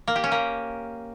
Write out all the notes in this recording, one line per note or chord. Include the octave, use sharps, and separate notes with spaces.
A#3
G4
C#4
A#3